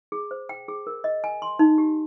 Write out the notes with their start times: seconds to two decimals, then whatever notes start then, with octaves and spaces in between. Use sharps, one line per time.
0.12 G#4
0.31 C5
0.49 G5
0.68 G#4
0.87 A#4
1.04 D#5
1.24 G#5
1.42 C6
1.59 D#4
1.78 G4